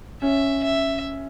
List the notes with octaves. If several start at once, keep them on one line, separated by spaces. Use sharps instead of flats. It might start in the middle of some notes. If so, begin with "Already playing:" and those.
C#4 E5
E5